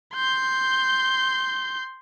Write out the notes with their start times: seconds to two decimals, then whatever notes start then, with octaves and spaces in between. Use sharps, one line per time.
0.15 C6 G6